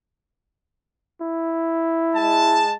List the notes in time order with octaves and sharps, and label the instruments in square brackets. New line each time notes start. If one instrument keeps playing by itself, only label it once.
[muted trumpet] E4
[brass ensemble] G#3 A5